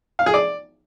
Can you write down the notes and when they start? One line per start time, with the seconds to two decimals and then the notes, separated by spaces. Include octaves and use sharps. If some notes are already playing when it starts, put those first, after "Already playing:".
0.19 F5
0.26 G#4
0.34 D5